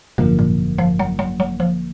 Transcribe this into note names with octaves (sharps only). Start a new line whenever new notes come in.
G#1 F#2 B2 D3 F3 A#3
A#2
F3
F#3
F#3
F#3
F3